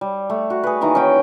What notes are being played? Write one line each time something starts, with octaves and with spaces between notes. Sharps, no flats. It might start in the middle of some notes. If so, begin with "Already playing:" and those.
G3
A3
F#4
G#4 B4
D#3 E3 A#3 A#5
C#4 G5